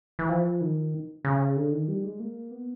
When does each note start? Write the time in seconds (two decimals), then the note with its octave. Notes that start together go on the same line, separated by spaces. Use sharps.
0.19 E3
0.29 F3
0.61 D#3
1.25 C#3
1.56 D3
1.72 D#3
1.88 G3
2.04 G#3
2.20 A#3
2.51 B3